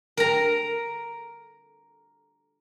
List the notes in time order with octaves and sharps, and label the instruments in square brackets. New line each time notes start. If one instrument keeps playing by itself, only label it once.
[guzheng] A#4 A#5